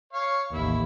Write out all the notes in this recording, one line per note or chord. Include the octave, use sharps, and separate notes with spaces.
C#5 F5
A1 D#2 E4